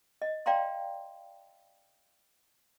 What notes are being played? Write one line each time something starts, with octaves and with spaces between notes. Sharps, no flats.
D#5
D5 F5 G5 A#5 C6